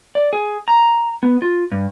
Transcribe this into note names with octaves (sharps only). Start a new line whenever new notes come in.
D5
G#4
A#5
B3
F4
G2